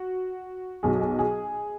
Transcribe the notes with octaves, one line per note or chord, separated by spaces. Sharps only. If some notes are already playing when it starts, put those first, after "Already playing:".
Already playing: F#4
B1 B2 F#3 G#4
G#4
G#4